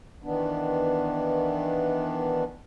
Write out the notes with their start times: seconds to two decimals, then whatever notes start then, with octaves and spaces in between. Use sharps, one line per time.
0.24 D#3 E3 B3 D4